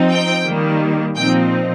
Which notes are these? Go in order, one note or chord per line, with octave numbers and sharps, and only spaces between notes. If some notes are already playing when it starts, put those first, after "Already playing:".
Already playing: F3 C4 D#4
G5
D#3 G3 A#3
A#2 F3 C4 D#4 G5